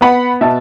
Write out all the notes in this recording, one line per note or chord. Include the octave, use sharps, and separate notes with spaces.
B3 F#5 B5
B2 E5 A5